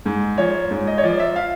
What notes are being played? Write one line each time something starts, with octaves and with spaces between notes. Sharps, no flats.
G#2
F3 C#5
G#2
D#5
C#5
F3 D5
E5
F5